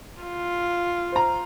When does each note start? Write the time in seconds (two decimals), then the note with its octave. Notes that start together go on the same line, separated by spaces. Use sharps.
0.22 F4
1.12 C5 A#5